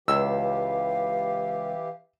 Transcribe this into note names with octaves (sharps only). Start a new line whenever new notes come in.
C#2 E3 G4 F5 E6